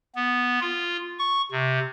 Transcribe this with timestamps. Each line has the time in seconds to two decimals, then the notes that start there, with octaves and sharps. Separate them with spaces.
0.16 B3
0.61 F4
1.19 C#6
1.52 C3